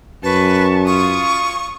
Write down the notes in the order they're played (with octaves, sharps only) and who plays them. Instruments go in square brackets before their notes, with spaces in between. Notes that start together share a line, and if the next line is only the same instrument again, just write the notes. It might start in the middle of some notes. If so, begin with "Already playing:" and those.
[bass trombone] F#2 [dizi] B4 [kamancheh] A5 C#6
[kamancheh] F4 D#6 [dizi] C#6